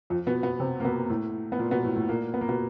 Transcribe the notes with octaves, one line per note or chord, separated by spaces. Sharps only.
F2 F3
B2 B3
B2 B3
C3 C4
A#3
B2 B3
A2 A3
B3
A#2 A#3
B2 B3
A2 A3
A2 A3
A#2 A#3
B3
A#3
B2 B3